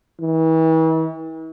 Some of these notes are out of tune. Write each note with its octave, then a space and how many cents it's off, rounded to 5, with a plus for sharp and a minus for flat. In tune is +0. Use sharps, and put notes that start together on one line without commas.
E3 -40